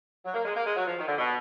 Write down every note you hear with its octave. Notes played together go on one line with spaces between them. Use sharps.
F#3
A#3
G#3
A#3
G#3
F#3
F3
D#3
D3
B2